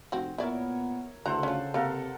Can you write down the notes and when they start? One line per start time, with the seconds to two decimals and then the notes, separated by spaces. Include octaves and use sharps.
0.12 F1 C4 F#4
0.38 A#2 B3 E4 A#4 C#5 D5 E5
1.26 D2 C#3 E3 A4 C5 F#5 A#5
1.43 C#4 F4
1.74 C3 A#3 A4 A#4 F5 F#5